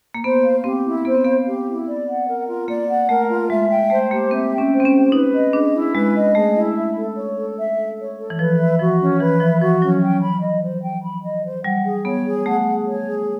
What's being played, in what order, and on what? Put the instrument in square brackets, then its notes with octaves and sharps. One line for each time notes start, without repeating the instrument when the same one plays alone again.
[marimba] A#3
[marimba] B3 [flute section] C5
[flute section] F5
[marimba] C4 [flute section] G4
[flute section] E4
[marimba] B3 [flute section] C5
[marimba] C4
[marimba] B3 [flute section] F5
[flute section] G4
E4
D5
F#5
A#4
F4
[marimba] A#3 [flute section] D5
[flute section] F#5
[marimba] A3 [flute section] A#4
[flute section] F4
[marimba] G#3 [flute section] E5
[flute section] G5
[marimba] A3 [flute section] C5
[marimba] A#3 [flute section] G4
[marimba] C4 [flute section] E5
[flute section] G5
[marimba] C#4
[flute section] C5
[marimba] C4
C#4
[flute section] G4
[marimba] D#4 [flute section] B4
[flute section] D#5
[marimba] D4 [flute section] G#4
[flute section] E4
[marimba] G#3 [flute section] B4
[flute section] D#5
[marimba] A3 [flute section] G#4
[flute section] E4
E5
A4
C#5
A4
E5
A4
C#5
A4
[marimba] E3
[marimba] F3 [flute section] B4
[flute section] E5
[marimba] F3 [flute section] F#4
[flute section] C#4
[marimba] E3 [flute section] B4
[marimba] F3 [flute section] E5
[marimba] F3 [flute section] F#4
[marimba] F#3 [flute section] C#4
[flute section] G5
B5
D#5
C5
G5
B5
D#5
C5
[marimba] G3 [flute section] F#5
[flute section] G#4
[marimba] B3 [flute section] C#5
[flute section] G#4
[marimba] A3 [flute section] F#5
[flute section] G#4
C#5
G#4